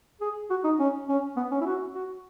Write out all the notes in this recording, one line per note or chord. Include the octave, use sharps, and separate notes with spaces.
G#4
F#4
D#4
C#4
C#4
B3
C#4
E4
F#4
F#4